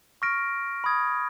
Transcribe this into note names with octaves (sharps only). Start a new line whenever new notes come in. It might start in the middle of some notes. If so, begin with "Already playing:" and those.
C#6 F6 A#6 D7
B5 D#6 G#6